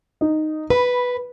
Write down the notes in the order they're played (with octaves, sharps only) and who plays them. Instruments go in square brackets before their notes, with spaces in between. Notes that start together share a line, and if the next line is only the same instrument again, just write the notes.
[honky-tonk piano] D#4
[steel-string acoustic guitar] B4 [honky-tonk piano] B5